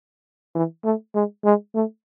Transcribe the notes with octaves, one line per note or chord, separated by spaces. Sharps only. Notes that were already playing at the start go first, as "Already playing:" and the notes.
E3
A3
G#3
G#3
A3